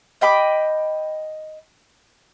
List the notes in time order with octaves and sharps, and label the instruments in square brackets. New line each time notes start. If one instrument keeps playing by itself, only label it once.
[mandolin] D#5 G5 B5 D6